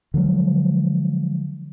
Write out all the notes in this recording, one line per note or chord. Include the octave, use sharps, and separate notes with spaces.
D3 F3 F#3 G#3